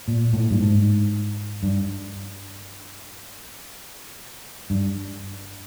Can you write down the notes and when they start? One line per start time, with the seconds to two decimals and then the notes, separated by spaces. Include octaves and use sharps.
0.08 A#2
0.33 A2
0.50 G2
0.60 G#2
1.63 G2
4.70 G2